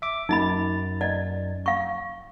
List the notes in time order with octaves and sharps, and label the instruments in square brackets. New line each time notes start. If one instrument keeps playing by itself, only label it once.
[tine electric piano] E5 D6
[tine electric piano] F#2 A6 [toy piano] D#4 D#5 B5
[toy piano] D5 D#5
F5 C#6